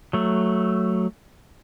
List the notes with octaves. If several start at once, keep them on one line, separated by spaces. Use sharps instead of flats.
F#3 A3